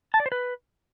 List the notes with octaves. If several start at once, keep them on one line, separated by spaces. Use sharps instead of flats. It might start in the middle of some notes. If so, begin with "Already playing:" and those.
A5
D5
C5
B4